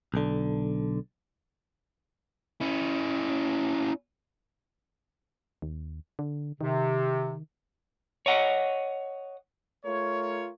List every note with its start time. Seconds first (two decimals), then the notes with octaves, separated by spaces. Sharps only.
0.14 B1 D3
2.60 C#4 E4
5.62 D#2
6.19 D3
6.61 C3 D#3
8.26 C#5 D#5 F#5
9.84 A3 F4 A#4 C#5